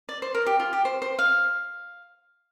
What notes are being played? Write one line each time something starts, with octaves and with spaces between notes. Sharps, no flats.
D5
C5
A#4
G4
F4
G4
C5
C5
F5